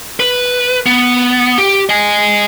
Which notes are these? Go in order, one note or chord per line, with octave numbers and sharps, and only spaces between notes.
B4
B3
G4
D#5 G#5